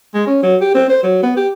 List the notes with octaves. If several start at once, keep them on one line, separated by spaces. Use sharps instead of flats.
G#3
C#4
F#3
G4
C4
C5
F#3
B3
G4